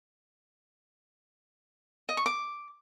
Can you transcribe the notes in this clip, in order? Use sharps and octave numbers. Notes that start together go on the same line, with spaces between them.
D#5
C#6
D6